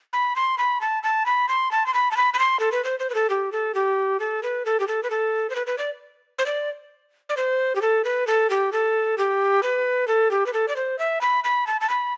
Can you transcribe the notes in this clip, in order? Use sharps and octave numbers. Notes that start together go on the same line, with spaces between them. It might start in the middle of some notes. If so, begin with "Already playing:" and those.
B5
C6
B5
A5
A5
B5
C6
A5
C6
B5
A5
B5
B5
C6
A4
B4
C5
C5
B4
A4
G4
A4
G4
A4
B4
A4
G4
A4
B4
A4
C5
B4
B4
D5
C5
D5
D5
C5
G4
A4
B4
A4
G4
A4
G4
B4
A4
G4
B4
A4
D5
C5
E5
B5
B5
A5
A5
B5